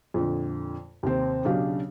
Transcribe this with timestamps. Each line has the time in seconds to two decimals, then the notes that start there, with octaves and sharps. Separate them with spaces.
0.14 F2 A#2 D3
1.03 D#2 C3 C4
1.45 B1 C#3 D4 F#4 G4 F5